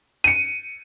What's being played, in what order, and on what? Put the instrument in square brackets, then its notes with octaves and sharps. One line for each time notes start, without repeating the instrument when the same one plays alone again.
[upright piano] C#7 D#7